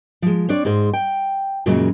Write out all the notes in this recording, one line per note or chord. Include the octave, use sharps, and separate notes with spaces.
F3 G#3
C4 D4 C#5 D5
G#2 G#3 C5
G5
F#2 A#2 C#3 F#3 G#3